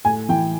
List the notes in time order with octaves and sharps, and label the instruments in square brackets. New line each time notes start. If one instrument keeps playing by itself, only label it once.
[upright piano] A2 G#5
E3 G5